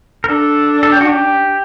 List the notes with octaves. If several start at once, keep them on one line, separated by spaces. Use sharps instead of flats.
A#4
D4 A4
A4
G4
F#4
G4